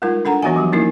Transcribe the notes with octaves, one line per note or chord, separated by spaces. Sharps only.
G3 G#3 D#4 F4 A#4
D4 A4 F#5 A#5
E3 B3 F#4 D#5 E5 G#5
F3 F#3 F#4 G4
A#3 C#4 D#4 E4 A#4